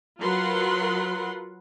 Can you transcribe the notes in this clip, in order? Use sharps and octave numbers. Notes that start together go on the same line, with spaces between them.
F#3 F4 A#4 B4 F#5 C6